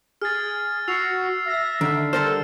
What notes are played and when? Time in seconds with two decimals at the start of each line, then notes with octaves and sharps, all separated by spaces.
0.22 G#4 F6 A6
0.88 F#4 E6 C7 F7
1.48 E5 A#6
1.81 D3 D#3
2.13 G3 A4 A#4 C5 F6